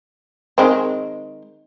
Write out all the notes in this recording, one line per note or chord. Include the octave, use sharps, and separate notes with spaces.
D#3 G#3 C4